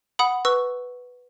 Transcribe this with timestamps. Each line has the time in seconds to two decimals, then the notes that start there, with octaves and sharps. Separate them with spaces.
0.19 F#5 B5 D#6
0.45 B4 C#6 E6